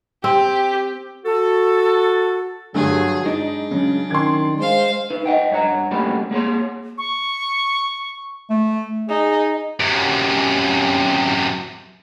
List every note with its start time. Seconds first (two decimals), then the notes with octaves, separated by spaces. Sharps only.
0.24 C4 G4
1.25 F#4 A4
2.75 G2 D3 F#3 G#4
3.26 G#3 D4 D#4
3.71 C#3 F#3 C#4
4.10 D#3 C6 G#6
4.58 G#3 C5 F5
5.10 D#4 B4
5.26 D#5 F#5 G5
5.51 G2 C#5 F#5 A#5
5.91 F#2 G3 A3 A#3 F#4 B5
6.31 A#3 G#4 C#5 C6
6.98 C#6
8.50 A3
9.09 D#4 G#4
9.80 F#2 C3